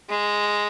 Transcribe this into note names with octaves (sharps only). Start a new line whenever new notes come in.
G#3